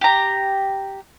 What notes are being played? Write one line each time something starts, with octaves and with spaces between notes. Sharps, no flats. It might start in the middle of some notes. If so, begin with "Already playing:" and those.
G4 A#5